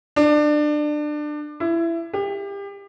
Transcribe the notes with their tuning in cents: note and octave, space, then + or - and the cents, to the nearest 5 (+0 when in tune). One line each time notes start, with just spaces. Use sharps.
D4 +25
E4 +20
G4 +30